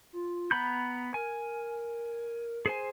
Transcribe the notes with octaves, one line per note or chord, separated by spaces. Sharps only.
F4
B3 A#5 B5 G6
A#4 G#5
G#4 C5 G#5